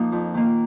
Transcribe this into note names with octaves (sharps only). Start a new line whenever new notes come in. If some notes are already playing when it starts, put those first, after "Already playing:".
Already playing: F3 A#3 D#4
F2
D#3 A#3